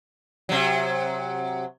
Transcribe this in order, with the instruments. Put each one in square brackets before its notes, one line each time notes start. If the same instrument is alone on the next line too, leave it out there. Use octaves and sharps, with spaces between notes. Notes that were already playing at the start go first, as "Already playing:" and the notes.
[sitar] C3 F#3